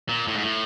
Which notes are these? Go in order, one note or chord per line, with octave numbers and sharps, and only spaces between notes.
A#2
A2
G#2
A2